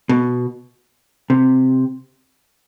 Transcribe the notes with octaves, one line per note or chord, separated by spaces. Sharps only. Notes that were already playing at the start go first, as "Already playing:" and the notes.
B2
C3